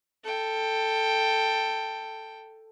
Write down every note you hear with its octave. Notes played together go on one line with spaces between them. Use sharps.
A4 G5